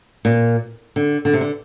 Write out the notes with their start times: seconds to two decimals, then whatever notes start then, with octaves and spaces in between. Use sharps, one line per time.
0.25 A#2
0.96 D3
1.25 D3
1.33 C3
1.41 D3